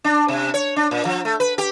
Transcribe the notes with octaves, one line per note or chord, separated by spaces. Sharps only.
D4
C3
C#5
D4
A#2
F3
A3
B4
G4